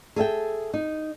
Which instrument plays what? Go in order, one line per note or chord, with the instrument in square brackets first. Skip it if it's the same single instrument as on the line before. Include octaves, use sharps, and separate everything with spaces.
[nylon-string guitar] G#4 A4 E5 G5
D#4